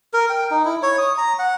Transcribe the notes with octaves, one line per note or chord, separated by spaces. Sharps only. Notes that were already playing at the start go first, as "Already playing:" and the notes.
A#4
G5
D#4
E4
C#5
D#6
A#5
F#5